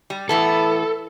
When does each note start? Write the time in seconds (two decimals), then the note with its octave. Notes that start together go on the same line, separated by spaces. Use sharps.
0.10 G3
0.29 A2 E3 B3 A4